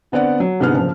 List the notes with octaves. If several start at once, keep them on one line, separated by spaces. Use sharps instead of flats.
D3 B3 C4 D5 F#5
F#3
C2 G#2 D3 B3 G#4 F6
F#1 F3